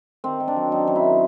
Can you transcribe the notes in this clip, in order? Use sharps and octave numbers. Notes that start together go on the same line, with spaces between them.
D#3 C4
D#3
D4
F#3
F#2 D#4
F#2
E4
D#3